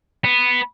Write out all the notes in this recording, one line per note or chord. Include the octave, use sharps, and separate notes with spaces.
B3